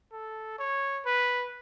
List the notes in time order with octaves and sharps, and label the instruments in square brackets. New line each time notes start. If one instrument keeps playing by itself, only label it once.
[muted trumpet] A4
C#5
B4